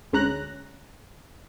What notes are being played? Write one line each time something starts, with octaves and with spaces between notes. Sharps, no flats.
D2 G#3 C#4 A#5 F#6